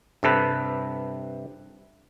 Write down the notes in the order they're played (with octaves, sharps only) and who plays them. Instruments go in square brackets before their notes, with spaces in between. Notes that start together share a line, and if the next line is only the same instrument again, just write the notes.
[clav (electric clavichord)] G2 C3 A4 B4